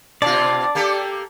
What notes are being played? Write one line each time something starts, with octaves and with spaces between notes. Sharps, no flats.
B2 C4 D4 F4 D5
A#3 G4 A4